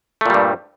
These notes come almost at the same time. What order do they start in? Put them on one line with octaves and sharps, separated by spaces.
A3 A#2 G3 G2